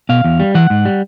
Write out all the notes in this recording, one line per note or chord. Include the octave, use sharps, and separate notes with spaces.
B2 F5
E2
G3
E3 F#5
G#2
G3